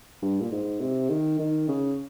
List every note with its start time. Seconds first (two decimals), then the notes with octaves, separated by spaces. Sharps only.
0.22 G2
0.41 A#2
0.51 G#2
0.80 C3
1.09 D#3
1.39 D#3
1.68 C#3